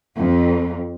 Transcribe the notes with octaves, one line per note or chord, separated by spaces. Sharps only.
F2